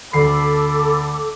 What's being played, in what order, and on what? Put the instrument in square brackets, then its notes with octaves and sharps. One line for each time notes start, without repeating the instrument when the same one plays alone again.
[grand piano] D2 C7 [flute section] A4 D6 [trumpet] B5